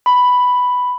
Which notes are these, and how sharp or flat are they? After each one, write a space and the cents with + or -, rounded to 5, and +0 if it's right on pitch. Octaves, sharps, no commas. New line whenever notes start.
B5 +5